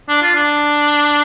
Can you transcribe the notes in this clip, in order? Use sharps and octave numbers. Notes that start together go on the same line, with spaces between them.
D4
F4
D4